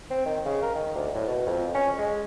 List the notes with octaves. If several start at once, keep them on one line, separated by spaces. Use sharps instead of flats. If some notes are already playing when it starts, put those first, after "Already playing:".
C4
D#3
C#3
A#4
D#3
D2
A2
B2
F2
C#4
G#3